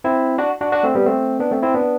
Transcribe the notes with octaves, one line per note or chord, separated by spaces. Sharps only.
C4 E4
D4 F#4
D4 F#4
D4 F#4
A3 C4
G3 B3
A3 C4
B3 D4
A3 C4
C4 E4
B3 D4